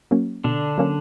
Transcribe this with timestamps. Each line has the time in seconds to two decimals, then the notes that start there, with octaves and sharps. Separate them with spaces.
0.11 F#3 A#3 C#4
0.44 B2 D3 D4
0.78 F#3 A#3 C#4